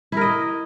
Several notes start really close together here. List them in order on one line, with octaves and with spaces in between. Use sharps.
E4 A#4 D#5